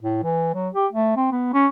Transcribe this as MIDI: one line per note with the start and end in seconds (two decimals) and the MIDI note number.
0.02 0.19 45
0.23 0.50 52
0.54 0.69 54
0.74 0.86 67
0.93 1.12 57
1.17 1.28 60
1.32 1.52 59
1.54 1.67 61